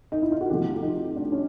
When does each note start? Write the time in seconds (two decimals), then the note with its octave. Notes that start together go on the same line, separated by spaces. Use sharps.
0.12 D#4
0.22 E4
0.31 F4
0.41 F#4
0.50 C3 F3 A3 G4
0.66 F4
0.82 D#4
1.16 D4
1.32 C#4